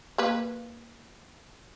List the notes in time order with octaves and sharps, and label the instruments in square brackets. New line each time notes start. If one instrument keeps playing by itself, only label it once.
[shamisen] A#3 B4